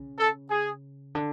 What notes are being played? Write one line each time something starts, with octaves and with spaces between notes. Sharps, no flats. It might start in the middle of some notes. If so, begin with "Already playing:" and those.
Already playing: C#3
A4
G#4
D3